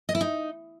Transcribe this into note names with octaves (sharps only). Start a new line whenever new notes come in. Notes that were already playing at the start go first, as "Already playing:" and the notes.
D#5
E4
D#4